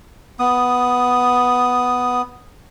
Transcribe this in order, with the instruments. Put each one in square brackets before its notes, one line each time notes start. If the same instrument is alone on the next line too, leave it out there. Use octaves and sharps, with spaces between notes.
[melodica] B3 D#6